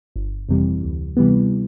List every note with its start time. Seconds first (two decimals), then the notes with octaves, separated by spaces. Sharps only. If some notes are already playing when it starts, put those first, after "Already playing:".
0.16 G1
0.49 F2 C3 E3 G3
0.84 D2
1.17 C3 E3 G3 B3